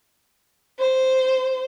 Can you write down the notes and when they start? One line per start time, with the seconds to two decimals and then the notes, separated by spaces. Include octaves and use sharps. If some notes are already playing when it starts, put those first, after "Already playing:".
0.79 C5